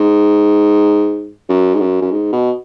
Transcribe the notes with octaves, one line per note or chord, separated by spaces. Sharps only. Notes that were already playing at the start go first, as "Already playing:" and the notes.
Already playing: G#2
F#2
G#2
F#2
F#2
G#2
B2